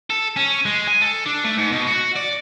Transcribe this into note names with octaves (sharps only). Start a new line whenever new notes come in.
A4
C#4
G#3
G#5
A4
D4
A3
G#2
B2
F#4
D5